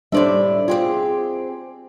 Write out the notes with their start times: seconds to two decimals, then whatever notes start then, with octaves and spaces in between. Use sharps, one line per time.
0.12 A2 G3 D4 C5 D5 E5
0.68 C4 F4 G4 G#4